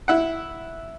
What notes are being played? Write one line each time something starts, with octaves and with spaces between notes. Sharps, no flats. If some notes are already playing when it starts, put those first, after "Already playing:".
E4 F#5